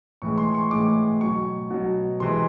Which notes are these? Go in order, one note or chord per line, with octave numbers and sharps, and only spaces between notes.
A2 E3 G#3 C#6
C6
C#6
A2 E3 G#3 D6
B2 F#3 C#6
B2 F#3
C3 E3 G#3 C6